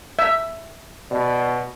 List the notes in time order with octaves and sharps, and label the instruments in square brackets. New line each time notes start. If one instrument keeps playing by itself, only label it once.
[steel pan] E5
[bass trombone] B2 [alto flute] D5